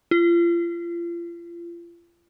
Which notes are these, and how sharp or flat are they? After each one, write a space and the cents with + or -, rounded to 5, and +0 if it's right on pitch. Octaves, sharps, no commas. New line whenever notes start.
F4 -35